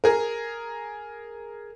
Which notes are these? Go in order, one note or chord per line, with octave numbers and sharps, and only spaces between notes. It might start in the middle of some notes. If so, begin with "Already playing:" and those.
G#4 A#4